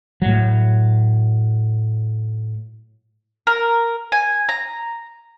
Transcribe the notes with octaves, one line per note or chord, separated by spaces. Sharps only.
A2 F#3
A#4
G#5
A#5